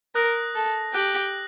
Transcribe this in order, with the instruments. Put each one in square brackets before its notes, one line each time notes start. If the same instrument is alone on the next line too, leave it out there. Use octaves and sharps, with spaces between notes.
[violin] A#4 [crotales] D#6 F#6 A#6
[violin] A4
[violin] G4 [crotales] F#6 A#6 F#7